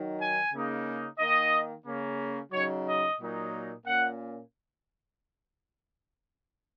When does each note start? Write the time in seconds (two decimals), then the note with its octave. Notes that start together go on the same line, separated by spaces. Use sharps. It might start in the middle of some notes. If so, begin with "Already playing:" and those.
Already playing: D#3 F#3 D#4
0.20 G#5
0.53 C#3 A#3 D#4
1.19 D#3 A#3 D#4 D#5
1.86 C#3 A#3 C#4
2.52 C#3 F#3 D#4 C#5
2.86 D#5
3.19 A#2 F#3 D#4
3.86 A#2 A#3 C#4 F#5